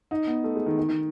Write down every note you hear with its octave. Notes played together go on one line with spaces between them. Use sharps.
D#4
B3
A3
G#3
D#3
D#3
D#3